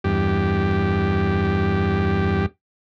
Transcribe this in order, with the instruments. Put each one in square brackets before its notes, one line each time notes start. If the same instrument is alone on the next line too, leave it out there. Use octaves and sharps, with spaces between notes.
[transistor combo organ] E2 G2 G4